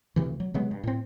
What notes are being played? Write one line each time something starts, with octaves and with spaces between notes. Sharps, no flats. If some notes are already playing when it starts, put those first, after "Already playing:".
D2 C3 E3
F#3
C3 F#3 G#3 B3
G2
A2 C4